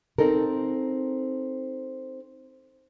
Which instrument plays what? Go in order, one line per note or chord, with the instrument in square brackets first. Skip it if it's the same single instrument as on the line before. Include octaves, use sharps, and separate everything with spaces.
[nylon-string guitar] C4 D#4 A4 A#4